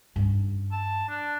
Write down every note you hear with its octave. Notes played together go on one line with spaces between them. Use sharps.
G2 C#4
A5
D4